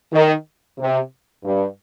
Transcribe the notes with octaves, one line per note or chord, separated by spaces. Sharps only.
D#3
C3
G2